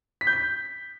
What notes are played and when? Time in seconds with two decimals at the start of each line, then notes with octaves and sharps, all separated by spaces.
0.21 B6
0.27 G6
0.33 B6